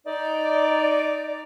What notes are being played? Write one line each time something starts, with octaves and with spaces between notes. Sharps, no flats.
D#4 D5